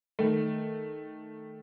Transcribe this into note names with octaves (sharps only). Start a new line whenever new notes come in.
D#3 A3